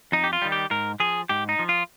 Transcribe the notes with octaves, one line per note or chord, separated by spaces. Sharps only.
F2 D#4
G4
F4
D#3 G3
G4
G#2 A#4
F3 G#4
G#2 G4
D#4
F3
F4